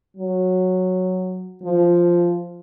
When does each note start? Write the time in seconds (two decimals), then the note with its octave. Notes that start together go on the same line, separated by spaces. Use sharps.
0.17 F#3
1.63 F3